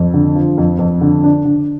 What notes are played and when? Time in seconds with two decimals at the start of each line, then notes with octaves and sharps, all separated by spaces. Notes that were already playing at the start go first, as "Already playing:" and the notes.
Already playing: F2
0.14 D3
0.35 F3
0.58 F2
0.79 F2
1.01 D3
1.24 D4
1.45 D3